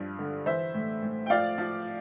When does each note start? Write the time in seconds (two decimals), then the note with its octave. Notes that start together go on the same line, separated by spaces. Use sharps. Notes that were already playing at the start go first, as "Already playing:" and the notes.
Already playing: G2 F3
0.18 D3
0.46 E3 C5 E5
0.74 A2
1.03 A2
1.26 G5
1.30 F3 D5 F5
1.58 F3